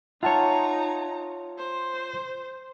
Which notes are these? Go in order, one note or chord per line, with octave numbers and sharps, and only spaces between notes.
D#4 F4 C#5 E5 F#5 A5 A#5
C5